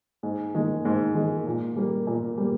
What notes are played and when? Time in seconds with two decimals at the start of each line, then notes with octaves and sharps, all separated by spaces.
0.23 G#2
0.55 D#3 G#3
0.85 G#2
1.15 D#3 G#3
1.46 A#2
1.76 G3 A#3
2.07 A#2
2.37 G3 A#3